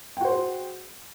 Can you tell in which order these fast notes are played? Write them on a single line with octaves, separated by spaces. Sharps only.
G5 F#4 C5 G#4